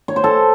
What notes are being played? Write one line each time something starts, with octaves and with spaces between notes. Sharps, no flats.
C#5
C5
A4